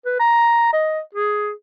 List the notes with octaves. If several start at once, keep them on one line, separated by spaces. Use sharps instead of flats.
B4
A#5
D#5
G#4